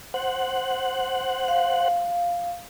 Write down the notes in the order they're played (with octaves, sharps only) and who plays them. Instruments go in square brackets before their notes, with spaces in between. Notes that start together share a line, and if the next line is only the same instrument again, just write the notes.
[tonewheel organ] C5 F#5
[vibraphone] F5